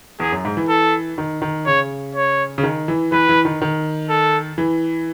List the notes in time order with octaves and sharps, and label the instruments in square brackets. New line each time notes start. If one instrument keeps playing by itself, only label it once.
[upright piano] E2 [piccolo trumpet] G#4
[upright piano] F#2
G#2
E3
[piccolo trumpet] A4
[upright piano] D#3
D#3
[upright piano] C#3 [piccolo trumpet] C#5
[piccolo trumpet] C#5
[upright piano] C#3
D#3
E3
[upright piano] E3 [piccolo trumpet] B4
[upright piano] E3
D#3
D#3
[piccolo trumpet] A4
[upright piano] E3